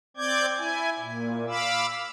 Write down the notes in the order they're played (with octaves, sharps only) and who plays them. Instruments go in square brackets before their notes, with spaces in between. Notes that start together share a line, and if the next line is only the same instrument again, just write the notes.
[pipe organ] C4 D5 D6 G6 G#6
E4 G#5
A#2
F5 B5 D6 E6